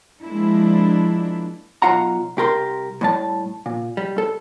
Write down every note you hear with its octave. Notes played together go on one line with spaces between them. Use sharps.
F3 G#3 A#3 D4 E4
B1 C3 F4 F#5 A#5
C2 G4 A#4 C6
A2 G3 A5
A#2
G3
A4